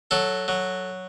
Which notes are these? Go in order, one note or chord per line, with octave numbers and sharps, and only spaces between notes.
F#3 A4
F#3